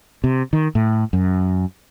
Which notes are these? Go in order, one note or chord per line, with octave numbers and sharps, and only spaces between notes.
C3
D#3
A2
F#2